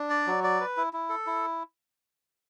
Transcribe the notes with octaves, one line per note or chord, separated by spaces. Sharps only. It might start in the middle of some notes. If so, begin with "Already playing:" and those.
Already playing: D4
D5
F#3
D5
B4
E4
E4
A4
E4